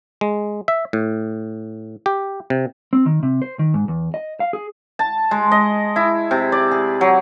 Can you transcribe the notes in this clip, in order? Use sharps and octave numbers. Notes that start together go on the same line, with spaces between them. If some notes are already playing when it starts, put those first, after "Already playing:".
G#3
E5
A2
G4
C3
C4
D#3
C3
C5
D#3
G#2
E2
D#5
F5
G#4
A5
G#3
D#5
E4
C3
D5
G#4
F#3